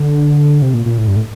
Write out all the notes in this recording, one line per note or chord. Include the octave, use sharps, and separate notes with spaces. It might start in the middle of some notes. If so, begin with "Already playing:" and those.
Already playing: D3
C3
A#2
A#2
A2
G2
A2